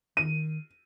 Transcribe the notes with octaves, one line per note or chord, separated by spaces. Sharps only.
D#3 D#7